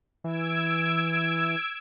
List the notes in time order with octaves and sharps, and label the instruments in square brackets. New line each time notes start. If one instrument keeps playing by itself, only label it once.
[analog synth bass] E3 [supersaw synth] E6 G#6 D7